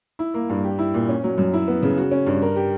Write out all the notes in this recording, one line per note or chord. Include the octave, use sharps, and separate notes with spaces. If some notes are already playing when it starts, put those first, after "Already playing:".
E4
A#3
G2
G4
E4
A#2
C#4
F#3
F#2
E4
B3
C#3
F#4
C#4
G2
A#4
G4